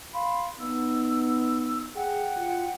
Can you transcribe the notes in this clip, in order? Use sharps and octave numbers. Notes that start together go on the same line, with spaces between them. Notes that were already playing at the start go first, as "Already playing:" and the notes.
F5 B5 C6
B3 D#4 E6
G#4 F#5 G5
F4 F#4